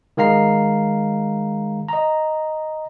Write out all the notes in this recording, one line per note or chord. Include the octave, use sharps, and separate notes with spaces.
D#3 G#3 F5 A#5 C7
D#5 A#5